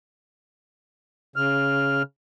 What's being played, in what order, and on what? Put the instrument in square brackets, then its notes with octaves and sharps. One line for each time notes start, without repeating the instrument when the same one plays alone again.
[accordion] C#3 F6